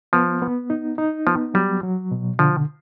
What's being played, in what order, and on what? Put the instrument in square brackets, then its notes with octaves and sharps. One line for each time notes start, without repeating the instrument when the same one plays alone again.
[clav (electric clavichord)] F3 [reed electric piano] B3
[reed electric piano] B3
D#4
D#4
[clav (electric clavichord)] F3 [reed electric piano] B3
[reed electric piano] F#3 [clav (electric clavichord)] G3
[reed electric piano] F#3
B2
[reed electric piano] D3 [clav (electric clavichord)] F3